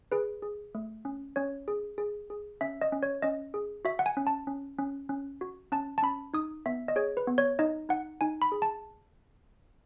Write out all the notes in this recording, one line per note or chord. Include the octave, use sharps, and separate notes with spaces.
G#4 B4
G#4
A3
C#4
C#4 C#5
G#4
G#4
G#4
C#4 E5
D#5
C#4
C#5
C#4 D#5
G#4
F#4 E5
F#5
G#5
C#4
A5
C#4
C#4
C#4
F#4
C#4 A5
A5
C#4 B5
D#4 D#6
B3 E5
D#5
G#4 C#5
B4
B3
C#5
D#4 D#5
D#4 F#5
D#4 G#5
B5
G#4
A5